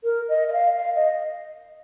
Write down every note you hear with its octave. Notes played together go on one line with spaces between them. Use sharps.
A#4
D#5
D#5
F5
F5
D#5